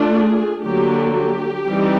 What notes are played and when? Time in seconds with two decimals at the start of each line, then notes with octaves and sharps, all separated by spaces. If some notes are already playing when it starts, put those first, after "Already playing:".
Already playing: A3 D4 F4
0.13 G#4
0.64 D3 F#3 A#3 G4
1.16 G4
1.68 E3 G3 C4 D#4